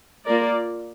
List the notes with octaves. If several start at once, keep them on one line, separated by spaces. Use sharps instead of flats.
A#3 F4 A#4 D5